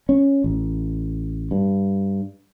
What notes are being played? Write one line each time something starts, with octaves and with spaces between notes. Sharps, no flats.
C#4
A1
G2